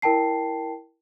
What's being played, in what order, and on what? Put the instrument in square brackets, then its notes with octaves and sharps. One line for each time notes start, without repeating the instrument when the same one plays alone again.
[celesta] E4 A#4 G5 A5 C7